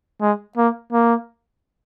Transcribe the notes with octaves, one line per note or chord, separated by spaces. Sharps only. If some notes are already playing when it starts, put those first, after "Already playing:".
G#3
A#3
A#3